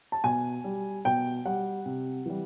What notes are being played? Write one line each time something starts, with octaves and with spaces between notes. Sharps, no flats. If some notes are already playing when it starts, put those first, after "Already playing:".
A5
B2 G#5
G3
B2 G5
G3 F#5
C3
E3 G3